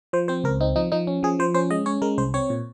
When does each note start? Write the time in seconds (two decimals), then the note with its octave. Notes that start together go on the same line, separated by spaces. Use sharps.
0.13 F3 C5
0.28 C4 C5
0.44 C#2 A#4
0.61 C4 D#4
0.76 F3 D#4
0.92 F3 D#4
1.07 C#4
1.23 F3 G#4
1.39 F3 C5
1.54 C#4 C5
1.71 G#3 D#5
1.86 C#4 C#5
2.02 G#3 A#4
2.17 C2 C5
2.34 C4 C#5
2.50 A#2